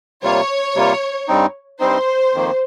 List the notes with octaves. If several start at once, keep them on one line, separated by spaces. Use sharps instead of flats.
C3 G3 A#3 F4 C#5
C3 G3 A#3 F4
G2 G3 C4 D#4
G2 G3 C4 D#4 C5
F2 D#3 A#3